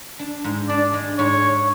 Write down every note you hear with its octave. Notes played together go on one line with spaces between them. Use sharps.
D4
G#2
D4 D5
G#3
G#2 C#5
G#2